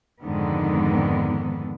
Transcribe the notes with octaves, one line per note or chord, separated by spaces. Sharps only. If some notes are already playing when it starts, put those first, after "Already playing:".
F2 G#2 D3 D#3 B3